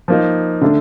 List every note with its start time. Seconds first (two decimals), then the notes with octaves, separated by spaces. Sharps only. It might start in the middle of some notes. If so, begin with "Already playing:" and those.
0.08 F3 A#3 D#4
0.61 D3 A3 D4